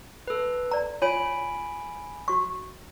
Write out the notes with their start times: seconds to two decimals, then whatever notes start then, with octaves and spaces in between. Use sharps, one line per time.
0.28 A4 B4
0.71 D5 A#5
1.02 F4 C#5 G#5 B5 D7
2.28 F#4 C#6